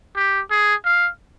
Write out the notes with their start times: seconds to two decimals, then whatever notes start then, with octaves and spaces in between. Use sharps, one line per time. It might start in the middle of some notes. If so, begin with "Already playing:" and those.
0.16 G4
0.51 G#4
0.84 F5